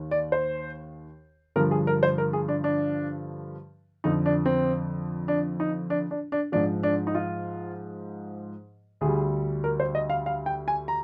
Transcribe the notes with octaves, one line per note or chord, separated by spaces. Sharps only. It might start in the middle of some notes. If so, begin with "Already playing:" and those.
Already playing: D#2 D#3
D5
C5
G2 D3 F3 A#4
G#4
A#4
C5
A#4
G#4
D4
D4
F2 D3 F3 D#4
D4
C4
D4
D#4
D4
D4
D4
G#2 F3 D4
D4
D#4
F4
D2 D3 G3 G#4
A#4
C5
D#5
F5
F5
G5
G#5
A#5